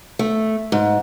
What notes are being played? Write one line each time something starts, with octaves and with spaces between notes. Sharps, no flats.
A3
G#2